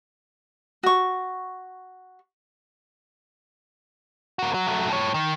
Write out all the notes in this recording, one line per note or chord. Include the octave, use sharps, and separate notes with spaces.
F#4 C#6
A#3 F#4
F#3
F#3 A3
G2 C#5
D#3